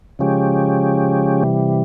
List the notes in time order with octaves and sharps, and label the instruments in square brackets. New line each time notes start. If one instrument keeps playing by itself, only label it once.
[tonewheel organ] C#3 F3 G#3 C#4 G4
C3 E3 G3